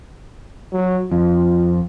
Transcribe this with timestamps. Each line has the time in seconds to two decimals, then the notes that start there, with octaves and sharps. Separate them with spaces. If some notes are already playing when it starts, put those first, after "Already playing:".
0.72 F#3
1.12 F2 F4